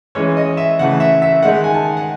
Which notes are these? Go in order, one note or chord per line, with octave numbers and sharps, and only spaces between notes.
E3 G#3 C#4 C#5
D#5
E5
C#3 E3 A3 F#5
E5
E5
D#3 G#3 D#4 F#5
G#5
A5
F#5